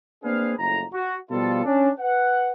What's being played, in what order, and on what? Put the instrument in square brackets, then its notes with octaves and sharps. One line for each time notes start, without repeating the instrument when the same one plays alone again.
[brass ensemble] A#3 C4 D4 G#4 B4 F5
F#1 F2 A2 A#5
F#4
B2 F3 G3 F4 A4
C#4 D4
B4 F#5